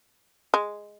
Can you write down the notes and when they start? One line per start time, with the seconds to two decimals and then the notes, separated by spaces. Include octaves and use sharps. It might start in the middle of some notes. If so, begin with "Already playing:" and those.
0.54 G#3